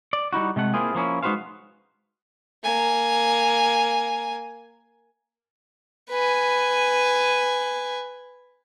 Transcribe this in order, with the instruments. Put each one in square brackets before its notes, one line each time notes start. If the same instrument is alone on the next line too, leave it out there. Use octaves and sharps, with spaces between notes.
[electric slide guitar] D5
G3 D#4 E4 F#4
C3 G#3 A3 F#5
A#3 C4 E4 F4 G#4
F3 A#3 C#4 E4
G#3 D#4 F#4 B4 C5 F5
[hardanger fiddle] A#3 G#5
B4 G#5